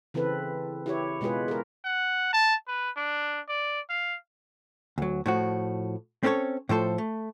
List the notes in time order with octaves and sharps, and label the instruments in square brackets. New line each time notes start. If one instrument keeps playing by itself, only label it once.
[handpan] C#3 E3 C4 A4 B4
E4 G4 C#5
B2 G#3 F4 G#4 B4
G#4 A#4
[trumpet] F#5
A5
B4
D4
D5
F5
[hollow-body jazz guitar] D2 F#3
A2 F3 F#4
C4 C#4 A4 B4 C#5
A2 F3 A4 C5
A3